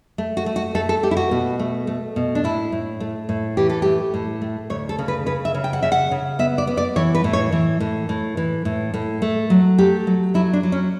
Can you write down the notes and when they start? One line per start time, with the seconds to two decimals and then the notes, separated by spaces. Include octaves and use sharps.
0.18 A3
0.37 F#4
0.46 A3
0.56 F#4
0.75 A3 A4
0.89 A4
1.03 A3 G4
1.11 E4
1.17 F#4
1.31 B2
1.60 A3
1.87 A3
2.16 B2
2.35 D4
2.44 A2 E4
2.72 A2
3.00 A3
3.29 A2
3.57 E3 G4
3.70 A4
3.82 A3 G4
4.14 A2
4.42 A3
4.70 D2 C#5
4.89 A4
4.99 C#3
5.08 B4
5.26 C#3 B4
5.45 E5
5.54 C#3
5.64 G5
5.73 F#5
5.83 C#3 E5
5.92 F#5
6.11 C#3
6.39 B3 E5
6.58 D5
6.67 B3
6.77 D5
6.96 E3 C#5
7.15 B4
7.24 A2
7.33 C#5
7.52 E3
7.80 A2
8.09 A2
8.37 E3
8.65 A2
8.94 A2
9.22 A3
9.50 F#3
9.78 A3 G4
10.07 F#3
10.34 F#3 E4
10.53 D4
10.63 F#3
10.72 C#4